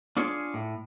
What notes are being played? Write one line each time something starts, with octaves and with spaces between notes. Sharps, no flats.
D4 F4 G#4 C#5
A2